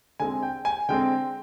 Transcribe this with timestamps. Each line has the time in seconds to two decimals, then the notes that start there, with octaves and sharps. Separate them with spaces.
0.20 D3 G#3 C4 G#5
0.43 G5
0.65 G#5
0.89 D3 G#3 C4 G5